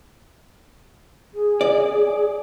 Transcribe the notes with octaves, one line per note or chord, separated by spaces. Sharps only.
G#4
D5